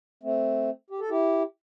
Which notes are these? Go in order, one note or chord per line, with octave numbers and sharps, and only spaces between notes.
A3 C4
G4
A4
E4 G4